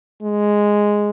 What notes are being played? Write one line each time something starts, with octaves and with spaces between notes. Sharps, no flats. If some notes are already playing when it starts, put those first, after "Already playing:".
G#3